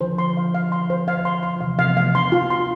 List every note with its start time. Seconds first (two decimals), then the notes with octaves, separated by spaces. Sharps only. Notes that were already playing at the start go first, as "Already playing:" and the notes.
0.01 D3 F3 C5
0.18 C6
0.37 F5
0.55 F5
0.72 C6
0.90 C5
1.08 F5
1.25 C6
1.43 C6
1.56 F3
1.61 C3 E3 F5
1.78 C3 E3 F5
1.89 B3
1.96 F3 A3 F5
2.14 B3 D4 C6
2.32 F4
2.50 C6